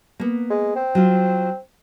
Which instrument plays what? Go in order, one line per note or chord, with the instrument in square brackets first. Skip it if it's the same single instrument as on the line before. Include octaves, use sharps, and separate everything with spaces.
[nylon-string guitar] A#3 B3
[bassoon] G#3
C4
[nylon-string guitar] F#3 F4